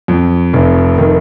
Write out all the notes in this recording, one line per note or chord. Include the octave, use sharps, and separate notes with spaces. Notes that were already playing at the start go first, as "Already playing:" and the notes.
F2
F1
D#3